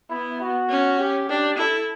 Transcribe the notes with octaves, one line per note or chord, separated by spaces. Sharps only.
B3 E4
F#4
C#4
G4
D4 G4
E4 A4